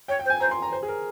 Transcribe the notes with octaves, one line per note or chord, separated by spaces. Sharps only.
C#5 G5
G5
C5
G#5
C5 A#5
C6
A#5
C5
G#4
A#4